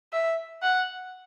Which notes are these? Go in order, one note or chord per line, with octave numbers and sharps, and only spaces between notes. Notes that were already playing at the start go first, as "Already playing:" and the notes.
E5
F#5